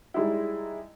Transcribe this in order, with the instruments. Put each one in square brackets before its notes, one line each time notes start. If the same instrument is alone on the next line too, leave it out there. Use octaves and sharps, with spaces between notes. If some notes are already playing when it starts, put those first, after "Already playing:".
[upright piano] G3 G#3 D#4 E4